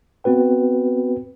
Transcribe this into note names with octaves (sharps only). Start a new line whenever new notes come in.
B3 C4 F#4 B4 G5